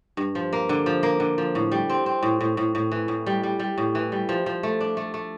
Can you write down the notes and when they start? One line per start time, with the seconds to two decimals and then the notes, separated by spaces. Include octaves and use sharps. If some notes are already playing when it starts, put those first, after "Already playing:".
0.17 G2
0.35 F3
0.53 A#3
0.69 D3
0.86 F3
1.03 A#3
1.20 D3
1.38 F3
1.55 A2
1.72 G3
1.90 C4
2.06 C4
2.23 A2
2.41 A2
2.57 A2
2.75 A2
2.92 E3
3.08 A2
3.26 G3
3.43 G3
3.59 G3
3.78 A2
3.95 E3
4.12 G3
4.29 F3
4.46 F3
4.63 A3
4.80 D4
4.97 A3
5.14 A3